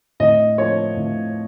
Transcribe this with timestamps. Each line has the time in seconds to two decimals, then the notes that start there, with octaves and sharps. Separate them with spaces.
0.20 A2 D#5
0.58 F3 A#3 C#5
0.97 A2